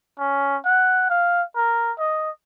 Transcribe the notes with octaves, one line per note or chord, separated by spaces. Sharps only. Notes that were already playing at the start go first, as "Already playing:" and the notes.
C#4
F#5
F5
A#4
D#5